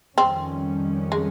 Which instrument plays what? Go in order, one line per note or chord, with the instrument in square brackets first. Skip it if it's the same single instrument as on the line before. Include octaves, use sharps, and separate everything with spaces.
[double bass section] F2 D#3 G3 C#4 [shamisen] C4
[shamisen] G#3